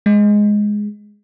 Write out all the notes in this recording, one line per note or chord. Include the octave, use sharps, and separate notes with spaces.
G#3